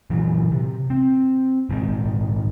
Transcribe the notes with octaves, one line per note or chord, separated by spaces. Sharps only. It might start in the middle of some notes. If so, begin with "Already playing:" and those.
A#2 E3 F#3
C3
C4
A#1 G#2 D#3